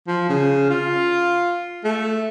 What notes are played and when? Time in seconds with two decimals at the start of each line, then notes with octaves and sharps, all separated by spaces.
0.07 F3
0.29 C#3
0.70 F4
1.84 A3